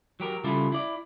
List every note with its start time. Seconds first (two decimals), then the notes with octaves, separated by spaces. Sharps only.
0.20 F#3 G4 A#4
0.44 C#3 G3 E4 F4 A4
0.72 E4 D5